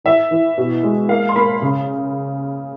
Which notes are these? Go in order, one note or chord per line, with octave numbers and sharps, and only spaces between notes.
E3 E5
E3
B2
G#3
A#3 F5
C6
A#3 B5
C#3